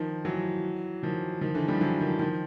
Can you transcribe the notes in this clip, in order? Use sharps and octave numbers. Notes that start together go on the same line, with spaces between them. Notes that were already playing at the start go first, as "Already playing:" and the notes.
Already playing: D#3 F3
E3 F#3
D#3 F3
D#3 F3
D3 E3
F3 G3
E3 F#3
D#3 F3
D#3 F3